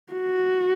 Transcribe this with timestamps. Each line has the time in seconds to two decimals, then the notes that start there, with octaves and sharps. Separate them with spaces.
0.13 F#4